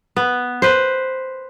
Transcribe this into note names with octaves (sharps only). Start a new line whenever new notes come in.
B3
B4 C5